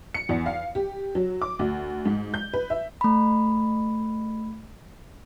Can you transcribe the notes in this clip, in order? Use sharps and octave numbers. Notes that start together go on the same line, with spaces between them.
C#7
E2
F5
G4
F#3
D6
D2
G#2
G6
B4
E5
A3 B5